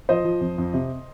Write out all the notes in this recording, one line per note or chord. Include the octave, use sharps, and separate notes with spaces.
F3 C5 D#5
F3
F2
F2
C3